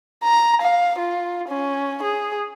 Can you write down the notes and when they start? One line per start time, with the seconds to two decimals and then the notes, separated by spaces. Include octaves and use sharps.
0.24 A#5
0.62 F5
0.98 F4
1.48 C#4
2.03 G#4